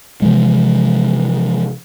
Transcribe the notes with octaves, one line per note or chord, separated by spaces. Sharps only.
C3 E3 F3 G#3